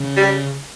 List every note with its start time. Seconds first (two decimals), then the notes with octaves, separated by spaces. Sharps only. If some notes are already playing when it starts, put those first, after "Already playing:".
Already playing: C#3
0.17 G3